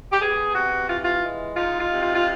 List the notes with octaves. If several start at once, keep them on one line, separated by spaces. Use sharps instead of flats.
G4
B3 G#4
C3 F#4
E3 F4
F4
G#3
D#4 F4
F4
C3
F4
F4